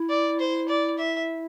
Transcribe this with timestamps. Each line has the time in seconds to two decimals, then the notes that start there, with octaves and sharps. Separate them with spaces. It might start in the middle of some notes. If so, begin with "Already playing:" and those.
Already playing: E4
0.09 D5
0.39 C5
0.68 D5
0.98 E5